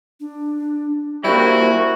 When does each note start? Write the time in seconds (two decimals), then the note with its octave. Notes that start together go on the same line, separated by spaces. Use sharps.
0.20 D4
1.24 G3 A#3 E4 F#4 C5